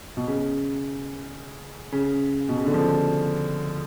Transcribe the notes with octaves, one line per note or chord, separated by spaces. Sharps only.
B2
C#3
C#3
B2
C#3
D3
F3